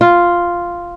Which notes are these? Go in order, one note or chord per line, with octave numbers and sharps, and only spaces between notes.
F4